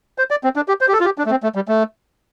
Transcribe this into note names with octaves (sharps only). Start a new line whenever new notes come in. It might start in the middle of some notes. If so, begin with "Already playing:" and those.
C5
D5
C4
D4
G4
C5
G4
A4
F4
G4
D4
A3
C4
A3
G3
A3